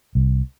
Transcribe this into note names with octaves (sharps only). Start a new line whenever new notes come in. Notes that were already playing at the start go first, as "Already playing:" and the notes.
C2